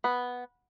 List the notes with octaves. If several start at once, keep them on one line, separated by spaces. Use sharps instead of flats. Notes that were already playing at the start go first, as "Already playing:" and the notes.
B3